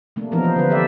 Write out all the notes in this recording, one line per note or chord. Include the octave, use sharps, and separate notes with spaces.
C3 A3 A#3 D4
E3 F3 B3 C#4 D#4 A#4
F4 C5
D3 G3 B4
G4 A4 D5 E5